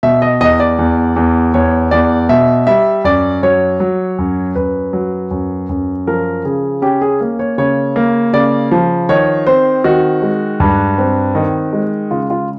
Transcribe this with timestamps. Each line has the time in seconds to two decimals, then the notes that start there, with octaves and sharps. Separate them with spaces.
0.03 B2 E5
0.22 D#5
0.41 E2 D#5
0.60 D5
0.79 E2
1.16 E2
1.54 E2 C#5
1.91 E2 D5
2.29 B2 E5
2.67 G3 E5
3.04 F#2 D5
3.42 F#3 C#5
3.80 F#3
4.19 F#2
4.55 F#2 B4
4.93 F#3
5.31 F#2
5.69 F#2
6.07 F3 A#4
6.45 C#3 G#4
6.82 C#4 G4
7.01 G#4
7.21 A#3
7.39 C#5
7.58 C#3 C#5
7.96 A#3
8.33 C#3 D5
8.71 F3
9.09 D#3 C#5
9.47 C4 C5
9.84 D#3 F#4
10.22 G#3
10.60 G2
10.98 C4
11.35 D#3
11.73 G#3
12.11 C#3 F4
12.30 F4